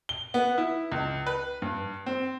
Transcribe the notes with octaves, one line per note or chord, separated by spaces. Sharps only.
G7
B3
E4
C#2
B4
G2
C4